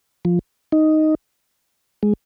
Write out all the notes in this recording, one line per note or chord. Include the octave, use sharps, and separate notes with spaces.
F3
D#4
G#3